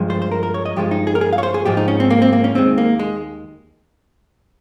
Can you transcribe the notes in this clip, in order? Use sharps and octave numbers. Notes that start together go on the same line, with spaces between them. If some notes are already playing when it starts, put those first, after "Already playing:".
Already playing: G2 F3 G#3
C5
C5
A#4
A#4
C#5
D#5
G2 F3 G#3 G4
D#4
G#4
A#4
G#4
F5
C#5
C5
G#4
G#2 F3 G#3 G4
D#4
C#4
C4
A#3
C4
A#3
C#4
D#2 D#3 G#3 C4
A#3
G#3